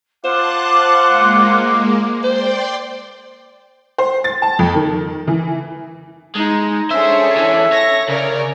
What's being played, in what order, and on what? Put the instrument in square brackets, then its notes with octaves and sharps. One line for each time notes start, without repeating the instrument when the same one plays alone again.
[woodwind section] F4 F#5 [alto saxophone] C5 [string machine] A5 F#6 [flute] D6
[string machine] G#3 A#3
[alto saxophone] C5 [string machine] D5 G5 C6
[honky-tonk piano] C5
A6
A5
F2
D#3
E3
[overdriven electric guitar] G#3 [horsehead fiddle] D#4
[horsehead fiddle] C#4 A4 [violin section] D4 G#4 C#5 [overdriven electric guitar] C5 [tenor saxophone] E5
[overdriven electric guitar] E3
[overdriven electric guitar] C#5 [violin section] A#6
[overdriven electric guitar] C#3 [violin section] A#4 C#5 D5